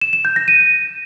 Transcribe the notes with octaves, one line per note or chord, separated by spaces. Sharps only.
E7
E7
G6
A#6
D#7